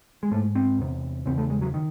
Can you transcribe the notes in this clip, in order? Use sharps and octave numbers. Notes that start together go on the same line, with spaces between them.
G#3
G#2 A3
C4
E2 C3
E2 C#3 C4
A3
G#3
F#3
D#3